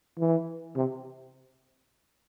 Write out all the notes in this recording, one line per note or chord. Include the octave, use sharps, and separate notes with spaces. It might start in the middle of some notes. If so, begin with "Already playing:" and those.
E3
C3